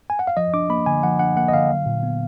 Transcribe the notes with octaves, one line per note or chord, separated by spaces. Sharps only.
G#5
F#5
F5
F3 D#5
D4 D6
A#3 B5
D3 G#5
F3 F#5
D4 F#5
A#3 F#5
D#5
D3 F5
F#3
A#2
B3